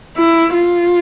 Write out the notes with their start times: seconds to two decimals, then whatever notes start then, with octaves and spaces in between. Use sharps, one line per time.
0.17 E4
0.54 F4